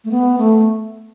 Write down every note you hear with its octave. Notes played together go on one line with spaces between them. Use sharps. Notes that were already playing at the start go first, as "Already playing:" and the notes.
A3
B3
A3